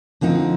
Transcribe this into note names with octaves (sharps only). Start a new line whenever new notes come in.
D3 F3 C4 D#4